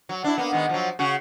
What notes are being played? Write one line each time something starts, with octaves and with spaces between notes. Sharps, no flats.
F#3
D4 E4
A#3 B3
D#3 G#3 B3
F3 F#3
C#3 F#4